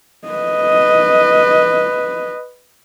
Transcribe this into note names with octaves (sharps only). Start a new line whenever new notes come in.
B4 D#5